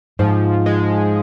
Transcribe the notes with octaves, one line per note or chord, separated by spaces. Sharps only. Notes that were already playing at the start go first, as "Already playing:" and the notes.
G#2 F3
G#3